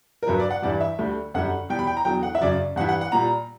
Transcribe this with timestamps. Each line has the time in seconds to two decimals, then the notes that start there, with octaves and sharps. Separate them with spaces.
0.23 A#4
0.27 G2 F#3 B4
0.40 D5
0.51 F#5
0.62 G2 E3 G3 D5
0.80 E5
0.99 D2 D3 G3
1.34 F#2 D3 G3 F#5
1.69 E2 B2 G3 G5
1.79 B5
1.87 G5
1.97 A#5
2.05 E2 D3 F#3 G5
2.23 F#5
2.35 E5
2.41 F#2 C#3 F#3 D5
2.76 G2 E3 G3 F#5
2.89 F#5
3.01 F#5
3.12 A#2 G3 A#5